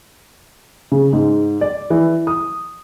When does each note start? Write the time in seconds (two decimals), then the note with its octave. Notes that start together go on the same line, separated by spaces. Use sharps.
0.92 C#3
1.13 G#2
1.61 D5
1.90 E3
2.27 D#6